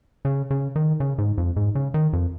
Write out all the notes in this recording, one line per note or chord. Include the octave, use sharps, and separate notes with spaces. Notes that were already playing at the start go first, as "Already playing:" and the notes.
C#3
C#3
D#3
C#3
G#2
F2
G#2
C#3
D#3
F2